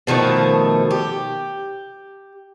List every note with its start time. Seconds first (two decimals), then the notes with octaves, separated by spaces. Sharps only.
0.07 B2 D#3 F3 A3
0.91 G4